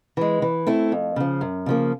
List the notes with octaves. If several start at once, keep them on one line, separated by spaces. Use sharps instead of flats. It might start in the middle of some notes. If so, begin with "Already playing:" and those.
E3 G#3
E3
A3 C4 E4
F2
C#3 F3
F#2
C#3 F3 A#3